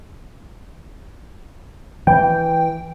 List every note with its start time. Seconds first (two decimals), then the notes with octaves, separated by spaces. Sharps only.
2.07 E3 G5